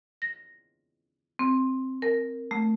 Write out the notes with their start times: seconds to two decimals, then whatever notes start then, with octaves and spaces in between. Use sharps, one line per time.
0.22 A#6
1.39 C4
2.02 A#4
2.51 A3